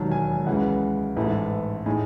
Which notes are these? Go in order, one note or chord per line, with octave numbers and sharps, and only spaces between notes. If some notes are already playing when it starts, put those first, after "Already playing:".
Already playing: E1 D#2 D#3 F#3 A5
G#5
C#2 C#3 E3 G#3 F#5
A1 G#2 E3 A3 E4
A2 G#3 D#4 G#5